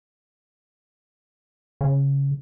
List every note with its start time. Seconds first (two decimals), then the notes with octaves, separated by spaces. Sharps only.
1.81 C#3